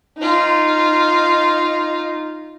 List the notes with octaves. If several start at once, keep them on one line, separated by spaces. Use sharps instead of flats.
D#4 F4